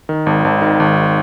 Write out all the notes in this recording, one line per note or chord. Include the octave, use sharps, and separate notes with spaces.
D#3
G#1
G#1
D#3
G#1